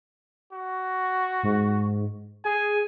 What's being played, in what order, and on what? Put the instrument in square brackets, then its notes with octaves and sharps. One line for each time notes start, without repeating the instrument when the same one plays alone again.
[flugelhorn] F#4
[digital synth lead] G#2
[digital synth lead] G#4 [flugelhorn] G#5